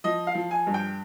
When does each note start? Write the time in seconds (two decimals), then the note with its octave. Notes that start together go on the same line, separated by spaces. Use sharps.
0.04 F3 D#5
0.27 F5
0.35 F3
0.51 G#5
0.67 G2
0.74 G5